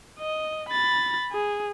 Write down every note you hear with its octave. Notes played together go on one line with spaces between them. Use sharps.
D#5
B5 A6
G#4